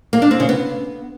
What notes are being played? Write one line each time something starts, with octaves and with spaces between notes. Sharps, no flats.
A#3
D4
C4
C#3
B3